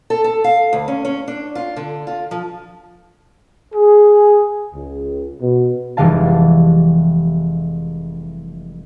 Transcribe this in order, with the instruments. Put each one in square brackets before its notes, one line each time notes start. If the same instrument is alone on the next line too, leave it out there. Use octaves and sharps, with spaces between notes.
[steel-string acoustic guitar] A4
A4
F5
D2
C#4
C#4
D4
F4
D3
F4
F3
[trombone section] G#4
C#2
B2
[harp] F1 E3 G3 G#3 F5 A5